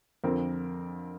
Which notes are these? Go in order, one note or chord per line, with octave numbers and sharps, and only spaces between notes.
F2 D3 F3 C4 A#4